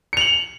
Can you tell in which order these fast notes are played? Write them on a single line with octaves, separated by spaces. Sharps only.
C#7 F7 F#7